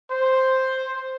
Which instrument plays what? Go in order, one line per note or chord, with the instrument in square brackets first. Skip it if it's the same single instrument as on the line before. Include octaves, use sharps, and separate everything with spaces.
[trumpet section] C5